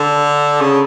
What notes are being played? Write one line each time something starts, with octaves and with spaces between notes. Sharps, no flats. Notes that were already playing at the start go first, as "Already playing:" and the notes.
Already playing: D3
C#3